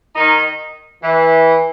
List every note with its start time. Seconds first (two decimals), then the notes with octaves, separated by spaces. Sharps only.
0.16 D#3 D#4
1.03 E3